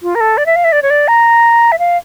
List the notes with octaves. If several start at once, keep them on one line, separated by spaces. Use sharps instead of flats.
F4
A#4
A4
D5
E5
F5
E5
D5
C#5
D5
A#5
E5
F5